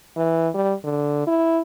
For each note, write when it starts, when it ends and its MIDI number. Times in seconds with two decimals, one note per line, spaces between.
0.16 0.48 52
0.54 0.73 55
0.84 1.22 50
1.27 1.61 64